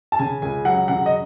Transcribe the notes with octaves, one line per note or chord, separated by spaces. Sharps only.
A5
C#3 G#5
C#2 G#5
F#3 F#5
C#3 F#5
D#5